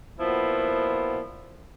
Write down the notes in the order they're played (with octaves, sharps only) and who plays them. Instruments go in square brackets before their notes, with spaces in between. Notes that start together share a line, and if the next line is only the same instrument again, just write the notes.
[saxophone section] A#2 F3 B3 E4 F#4